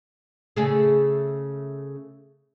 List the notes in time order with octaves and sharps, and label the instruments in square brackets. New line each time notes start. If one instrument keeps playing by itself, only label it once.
[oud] C#3 A3 G#4